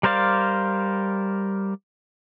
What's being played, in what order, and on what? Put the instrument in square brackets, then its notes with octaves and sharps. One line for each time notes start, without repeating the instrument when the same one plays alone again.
[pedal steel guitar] G3 A#4 C5 D5 F5